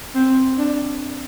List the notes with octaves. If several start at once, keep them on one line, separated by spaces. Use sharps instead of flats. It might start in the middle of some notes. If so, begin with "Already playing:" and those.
C4
D4